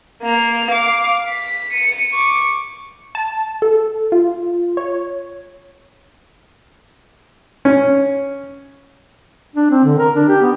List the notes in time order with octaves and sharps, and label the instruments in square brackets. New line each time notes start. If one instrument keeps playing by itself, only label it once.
[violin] A#3 F7
F5 D6
B6
C#7 D#7
C#6 D6
[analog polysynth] A5
A4
F4
C#5
[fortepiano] C#4
[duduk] D4
C4
D3
A#4
D4
G4
B3